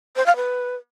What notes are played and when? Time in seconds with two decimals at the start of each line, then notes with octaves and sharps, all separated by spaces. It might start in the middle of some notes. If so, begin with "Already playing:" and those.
0.16 C5
0.26 F5
0.36 B4